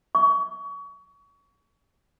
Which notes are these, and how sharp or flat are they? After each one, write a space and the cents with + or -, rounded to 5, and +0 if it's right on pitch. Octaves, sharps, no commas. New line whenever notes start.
C#6 +30